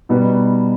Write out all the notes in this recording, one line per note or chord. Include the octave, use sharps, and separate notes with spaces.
B2 G3 B3 D#4 B4